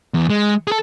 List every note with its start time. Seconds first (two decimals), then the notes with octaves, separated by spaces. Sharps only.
0.14 E2
0.30 G#3
0.67 G#4 A4